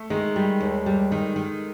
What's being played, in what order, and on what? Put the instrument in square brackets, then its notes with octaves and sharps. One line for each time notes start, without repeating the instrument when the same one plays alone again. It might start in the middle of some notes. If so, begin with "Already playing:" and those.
Already playing: [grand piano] A3
[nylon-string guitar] D#3 [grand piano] G#3
[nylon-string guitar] G3
D#2
G3
D#3
D#3